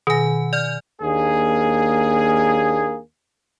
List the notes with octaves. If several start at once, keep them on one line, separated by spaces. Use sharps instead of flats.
B2 D#3 G#5 A#6
D5 F6 G6
D#2 A#3 D4 G#4